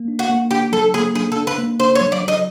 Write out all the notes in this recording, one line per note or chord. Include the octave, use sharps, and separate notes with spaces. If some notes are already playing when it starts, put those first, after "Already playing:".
Already playing: A#3
D4
F#4
A#3
D4 G4
F#3 A4
A#3 G#4
D4 G#4
A4
D4
B4
A#3
D4 C5
C#5
F#3
D5
F#3
D#5